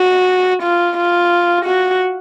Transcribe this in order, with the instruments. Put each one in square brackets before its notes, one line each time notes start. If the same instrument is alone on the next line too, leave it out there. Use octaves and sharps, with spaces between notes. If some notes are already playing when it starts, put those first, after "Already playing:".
Already playing: [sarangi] F#4
F4
F4
F#4